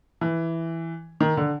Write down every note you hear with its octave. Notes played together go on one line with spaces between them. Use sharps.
E3
D#3
D3